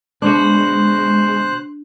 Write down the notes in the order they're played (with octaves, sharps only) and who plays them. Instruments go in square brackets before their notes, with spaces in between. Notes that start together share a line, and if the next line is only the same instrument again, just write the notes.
[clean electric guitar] D2 B2 F#4 [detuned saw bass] G#3 [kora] D4 [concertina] C5 F#6